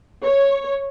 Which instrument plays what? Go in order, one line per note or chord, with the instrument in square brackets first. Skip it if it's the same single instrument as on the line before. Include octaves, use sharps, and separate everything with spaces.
[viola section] C#5